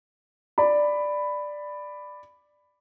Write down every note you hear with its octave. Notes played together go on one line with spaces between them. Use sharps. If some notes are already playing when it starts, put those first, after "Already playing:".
D5 B5